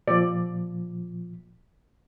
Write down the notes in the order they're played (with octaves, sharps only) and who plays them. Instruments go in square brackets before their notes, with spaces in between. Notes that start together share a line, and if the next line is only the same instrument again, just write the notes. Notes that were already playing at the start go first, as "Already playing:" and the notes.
[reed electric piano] A#2 F3 [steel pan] D5